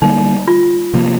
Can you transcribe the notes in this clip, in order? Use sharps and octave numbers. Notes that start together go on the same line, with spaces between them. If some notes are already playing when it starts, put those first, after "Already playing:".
D3 G3 A#3 D#4
F4
C3 F3 A#3